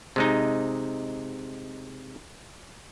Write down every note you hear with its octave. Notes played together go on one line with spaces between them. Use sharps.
C3 G#3 D#4